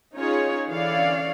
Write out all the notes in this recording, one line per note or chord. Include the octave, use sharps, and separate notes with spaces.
C#4 D#4 F4 G#4 C#5
D3 E3 C#4 C#5 D5 F5